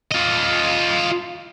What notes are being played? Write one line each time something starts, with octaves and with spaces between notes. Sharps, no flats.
F4 D#5